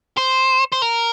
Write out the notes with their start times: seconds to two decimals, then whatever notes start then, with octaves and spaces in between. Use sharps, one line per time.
0.17 C5
0.72 C5
0.82 A#4